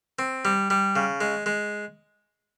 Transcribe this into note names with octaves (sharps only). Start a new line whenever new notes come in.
C4
G3
G3
C#3
G#3
G#3